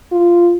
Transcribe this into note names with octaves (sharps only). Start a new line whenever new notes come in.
F4